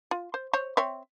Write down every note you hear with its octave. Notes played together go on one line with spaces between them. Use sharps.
F4
C5
C5 C#5
C4 C#5 E5